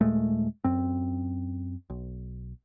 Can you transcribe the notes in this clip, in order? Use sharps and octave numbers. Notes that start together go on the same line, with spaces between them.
D#2 A#2 G#3 A3
F#2 C4
B1